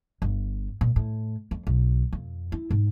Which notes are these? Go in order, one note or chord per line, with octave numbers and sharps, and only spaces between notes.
G1
A#2
A2
F2
B1
F2
E4
G#2